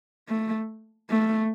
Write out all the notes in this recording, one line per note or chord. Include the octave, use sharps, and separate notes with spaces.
A3
A3